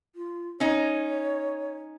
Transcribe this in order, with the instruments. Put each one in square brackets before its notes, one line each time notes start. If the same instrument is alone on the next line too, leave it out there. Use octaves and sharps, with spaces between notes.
[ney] F4
[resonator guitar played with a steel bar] C#4 D#4 [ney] C#5